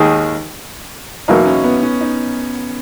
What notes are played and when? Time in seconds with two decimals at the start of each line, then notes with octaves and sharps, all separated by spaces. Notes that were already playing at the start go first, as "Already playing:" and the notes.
Already playing: D#2 D#3 G#3 D#4 G#4
1.28 E2 B2 F#3 A#3 D#4
1.46 C#4
1.64 B3
1.83 C#4
2.01 D#4